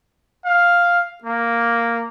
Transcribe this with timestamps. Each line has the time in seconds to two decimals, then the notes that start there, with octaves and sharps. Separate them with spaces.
0.45 F5
1.24 A#3